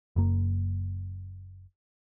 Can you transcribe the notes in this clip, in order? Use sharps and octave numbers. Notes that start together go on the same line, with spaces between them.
F#1 F#2 A#3